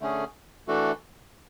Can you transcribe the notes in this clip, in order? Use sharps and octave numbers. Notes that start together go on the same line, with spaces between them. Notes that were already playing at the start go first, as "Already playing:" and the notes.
D3 A3 C#4 G#4
E3 A3 D4 F#4 A4